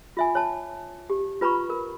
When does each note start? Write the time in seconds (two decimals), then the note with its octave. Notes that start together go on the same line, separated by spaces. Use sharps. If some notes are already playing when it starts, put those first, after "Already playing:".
0.17 F4 E5 G#5
0.35 C#5 A5
1.10 G4
1.41 F4 B4 A#5 B5 C#6
1.70 A#4